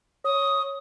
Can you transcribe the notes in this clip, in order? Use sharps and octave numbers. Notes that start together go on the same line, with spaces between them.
C#5 D#6